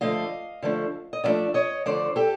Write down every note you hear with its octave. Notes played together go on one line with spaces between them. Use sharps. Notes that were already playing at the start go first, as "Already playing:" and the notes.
D3 F3 A3 D4 D#5 F5
D3 F3 A3 D4
D#5
D3 F3 A3 D4 D5 E5
C#5 D#5
D3 F3 A3 D4 C5 D5
G4 A4